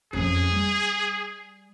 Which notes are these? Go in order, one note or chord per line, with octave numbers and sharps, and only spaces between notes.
F2 C#4 G#4
G3